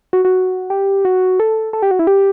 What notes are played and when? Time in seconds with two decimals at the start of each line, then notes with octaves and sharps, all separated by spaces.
0.13 F#4
0.25 F#4
0.70 G4
1.05 F#4
1.40 A4
1.73 A4
1.82 G4
1.91 F#4
1.99 E4
2.07 G4